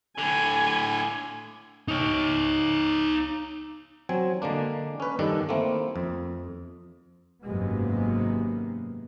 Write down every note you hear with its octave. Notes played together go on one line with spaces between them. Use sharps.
A2 D3 G#5
D#4 C#5
F#3 C4 G#5
D3 G#3 A#3 D4
C#4 B4
G2 D#3 D4 A4
A3 A#3 C4 E4
F2
G#1 F#2 C3 G#3 A#3 B3